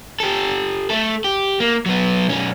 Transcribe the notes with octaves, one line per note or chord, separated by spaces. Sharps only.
G4 A4
A3 A4
G4
A#3
F#3 B3
B1 C#4